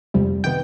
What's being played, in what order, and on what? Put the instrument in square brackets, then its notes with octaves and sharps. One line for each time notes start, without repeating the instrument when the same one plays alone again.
[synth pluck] F2 C3 G3
C3 D#3 B3 G5 G6